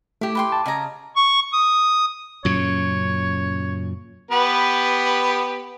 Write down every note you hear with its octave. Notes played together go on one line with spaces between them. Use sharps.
A3 E4 G4
B4 G5 C6
A5
C#3 D#5 G#5 A#5
C#6
D#6
F#2 A#2 C#3 C#5
B3 G4 B4